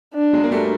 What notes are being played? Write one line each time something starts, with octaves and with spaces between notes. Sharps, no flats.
D4
F#3 G#3
A#3
G3 A3